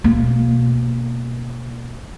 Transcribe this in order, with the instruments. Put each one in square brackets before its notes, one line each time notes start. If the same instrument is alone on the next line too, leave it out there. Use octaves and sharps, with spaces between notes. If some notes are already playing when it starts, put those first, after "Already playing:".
[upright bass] B2 A#3